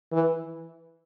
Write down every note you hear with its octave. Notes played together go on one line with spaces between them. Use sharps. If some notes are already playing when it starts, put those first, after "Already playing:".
E3